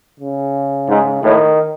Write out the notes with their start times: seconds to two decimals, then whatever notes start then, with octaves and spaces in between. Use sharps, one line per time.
0.20 C#3
0.89 G#2
1.23 A2 D#3